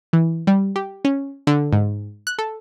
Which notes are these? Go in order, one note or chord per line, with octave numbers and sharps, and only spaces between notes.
E3
G3
G4
C#4
D3
G#2
F#6
A4